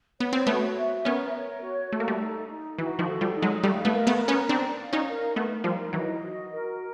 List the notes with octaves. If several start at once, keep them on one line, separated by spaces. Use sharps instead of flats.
B3 C#5
C4
A3 B3 F#4
E5
B3 C#4 A#4
C#5
F#4
A3 A4
A#3
G3 A3
D#4
D#4
E3 F#4
D#3 F3
A4
F3 G3
D#4
F#3 G#3
G3 A3 F5
A3 B3
A#4
A3 B3
A#5
B3 C#4
C4 D4 D5
F5
C#4 D#4
A#4
A3 B3 A#4
F3 G3 D#4
E3 F#3 D#5
F#4
A#4